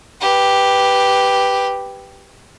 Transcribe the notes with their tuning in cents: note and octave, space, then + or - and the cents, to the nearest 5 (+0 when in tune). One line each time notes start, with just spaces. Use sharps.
G4 +0 B4 +0